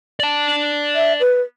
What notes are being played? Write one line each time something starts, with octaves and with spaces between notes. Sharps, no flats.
D5 A5
E5
B4